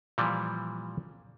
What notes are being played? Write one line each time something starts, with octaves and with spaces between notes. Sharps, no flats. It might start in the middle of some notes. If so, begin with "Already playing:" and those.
A#2 E3 F3 G3